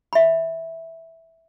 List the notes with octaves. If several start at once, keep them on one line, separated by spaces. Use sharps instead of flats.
E5 B5